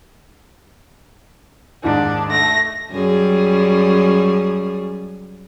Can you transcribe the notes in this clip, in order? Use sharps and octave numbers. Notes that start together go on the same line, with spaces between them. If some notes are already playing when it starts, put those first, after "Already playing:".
D#2 G#2 D#3 D4
A3 A#6
F#2 G3 G#4